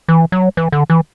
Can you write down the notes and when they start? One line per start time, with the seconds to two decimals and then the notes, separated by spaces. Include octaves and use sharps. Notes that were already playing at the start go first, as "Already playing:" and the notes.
0.08 E3
0.32 F#3
0.57 E3
0.72 D3
0.90 E3